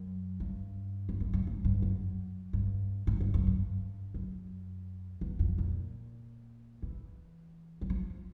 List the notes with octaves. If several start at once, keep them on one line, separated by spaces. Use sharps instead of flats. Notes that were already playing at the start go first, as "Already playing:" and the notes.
Already playing: F#2
G2
F2
F#2
G2
G#2
G2
F#2
G2
G#2
G2
F#2
G2
F#2
E2
F2
A#2
E3
F#3
F3